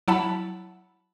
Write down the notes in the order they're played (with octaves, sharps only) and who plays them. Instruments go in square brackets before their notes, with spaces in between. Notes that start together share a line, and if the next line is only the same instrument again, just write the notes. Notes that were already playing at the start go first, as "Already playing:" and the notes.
[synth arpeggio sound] F#3 E4 F#5 A5 B5